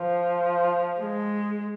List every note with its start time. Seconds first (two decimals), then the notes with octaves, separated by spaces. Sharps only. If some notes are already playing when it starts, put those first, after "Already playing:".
Already playing: F3
0.99 G#3